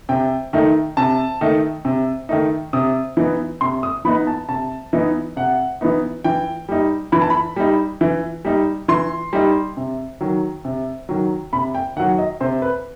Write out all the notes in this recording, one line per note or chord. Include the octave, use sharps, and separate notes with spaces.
C3 G5
D#3 A3 D#4
C3 A5
D#3 A3 D#4
C3
D#3 A3 D#4
C3 D#6
E3 B3 D#4
C3 C6
D#6
E3 B3 D#4 B5
A5
C3 A5
E3 B3 D#4
C3 F#5
E3 B3 D#4
E3 G5
G3 D#4
E3 B5
A5
B5
G3 D#4
E3
G3 D#4
E3 C6
G3 D#4
C3
D#3 F#3
C3
D#3 F#3
C3 B5
G5
D#3 F#3 F#5
D#5
C3 C5
B4